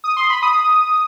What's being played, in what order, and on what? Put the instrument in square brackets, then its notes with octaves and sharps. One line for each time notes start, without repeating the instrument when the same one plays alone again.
[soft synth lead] D#6
C6
B5
D#6